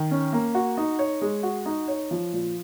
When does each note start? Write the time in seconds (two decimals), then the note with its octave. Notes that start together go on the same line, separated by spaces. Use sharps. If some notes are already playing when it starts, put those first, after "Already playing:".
Already playing: D#3
0.11 C#4
0.33 A#3
0.55 F#4
0.77 D#4
0.99 C#5
1.21 G#3
1.43 F#4
1.66 D#4
1.88 C#5
2.11 F3
2.33 A#2